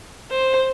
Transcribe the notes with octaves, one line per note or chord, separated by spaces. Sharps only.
C5